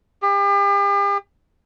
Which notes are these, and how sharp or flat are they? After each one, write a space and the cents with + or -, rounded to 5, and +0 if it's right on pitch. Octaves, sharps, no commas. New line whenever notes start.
G4 +40